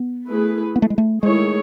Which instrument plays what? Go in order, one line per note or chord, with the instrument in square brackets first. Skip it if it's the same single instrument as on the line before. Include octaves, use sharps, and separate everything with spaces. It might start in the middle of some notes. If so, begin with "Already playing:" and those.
Already playing: [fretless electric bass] B3
[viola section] A3 E4 G#4 B4
[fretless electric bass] B3
A3
G#3
A3
[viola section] D#3 A3 E4 G#4 C#5 [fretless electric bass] G#3